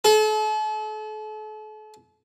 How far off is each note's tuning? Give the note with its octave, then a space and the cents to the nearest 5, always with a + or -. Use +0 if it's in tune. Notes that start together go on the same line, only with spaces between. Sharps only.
A4 -40